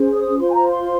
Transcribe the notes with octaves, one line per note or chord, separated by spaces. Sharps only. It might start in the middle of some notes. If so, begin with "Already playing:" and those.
Already playing: C#4 G#4 C5
D#6
F4 C5 C6
G#5
A#5
C6